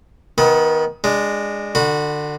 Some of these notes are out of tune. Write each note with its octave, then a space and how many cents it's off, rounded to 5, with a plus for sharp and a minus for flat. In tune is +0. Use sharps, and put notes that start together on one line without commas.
D#3 +25 B3 +0 B5 +0
G#3 -15 D4 +0
D3 +25 F#4 -20 B5 +0